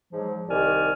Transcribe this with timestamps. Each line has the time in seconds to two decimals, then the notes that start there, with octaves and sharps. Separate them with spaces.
0.12 G#2 F3 F#3
0.49 C2 D#3 G4 D5 G#5 F6